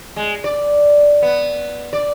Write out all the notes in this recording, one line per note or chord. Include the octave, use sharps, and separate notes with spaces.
G#3
D5
B3
D5